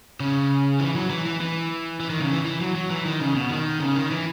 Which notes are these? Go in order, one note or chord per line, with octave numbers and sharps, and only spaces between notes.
C#3
E3
F#3
E3
E3
E3
E3
D#3
C#3
E3
E3
F#3
F#3
E3
D#3
C#3
B2
D#3
C#3
D#3
E3